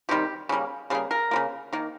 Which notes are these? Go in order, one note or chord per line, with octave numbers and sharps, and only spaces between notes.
C3 D#3 G3 G4
C#3 G3 A#3
C#3 G3 A#3 G#4
A#4
C#3 G3 A#3
D#3 A#3